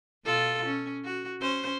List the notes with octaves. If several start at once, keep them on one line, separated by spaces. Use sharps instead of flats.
B2 F4 A4
C#4
F#4
C#4 C5